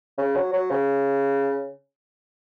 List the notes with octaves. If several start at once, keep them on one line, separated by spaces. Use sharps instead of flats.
C#3
F#3
F#3
C#3